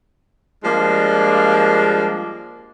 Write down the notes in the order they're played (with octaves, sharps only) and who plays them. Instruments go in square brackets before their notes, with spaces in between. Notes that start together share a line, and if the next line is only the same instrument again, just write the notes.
[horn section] F3 G3 G#3 A#3 D4